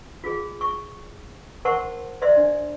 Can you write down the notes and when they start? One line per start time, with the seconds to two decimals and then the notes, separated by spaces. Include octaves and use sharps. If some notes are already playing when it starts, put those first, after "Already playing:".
0.24 F4 G#4
0.61 C#6
1.65 A#4 C5 F#5 A5 C6 C#6
2.21 C5 D5 E5 C6
2.36 D4